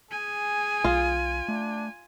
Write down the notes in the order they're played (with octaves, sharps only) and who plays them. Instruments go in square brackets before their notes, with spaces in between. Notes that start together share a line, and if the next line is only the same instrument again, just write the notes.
[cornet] G#4 [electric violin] G#5
[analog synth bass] B1 [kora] F4
[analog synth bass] A3 [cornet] D4